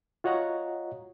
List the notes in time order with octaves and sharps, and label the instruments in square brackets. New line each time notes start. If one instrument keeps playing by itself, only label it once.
[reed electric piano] F4 F#4 C#5 D#5 F#5 A#5